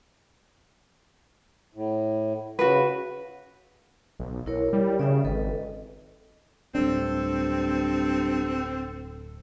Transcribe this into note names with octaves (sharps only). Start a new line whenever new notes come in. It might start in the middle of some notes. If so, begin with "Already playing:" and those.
A2
C#3 F#4 B4
B1
B1 E4 A#4 C#5
G3
C#3 D5 E5 G5
G#1 A4 B4 D#5
D1 G2 C4 D4 A4